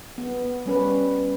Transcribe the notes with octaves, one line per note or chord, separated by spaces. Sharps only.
B3
G3 C#4 B4